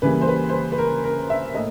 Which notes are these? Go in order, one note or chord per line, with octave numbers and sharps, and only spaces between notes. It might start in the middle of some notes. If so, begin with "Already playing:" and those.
C#2 C#3 E3 G3 A#3 B4
C5
B4
C5
B4
B4
A#4
A#4
E5
A2 A#3 D#5